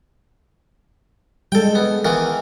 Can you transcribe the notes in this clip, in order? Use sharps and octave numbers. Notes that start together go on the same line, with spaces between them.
G3 G#3 A4 G5
B3
D#3 E3 B3